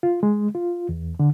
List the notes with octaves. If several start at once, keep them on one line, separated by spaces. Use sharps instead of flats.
F4
G#3
F4
E2
D3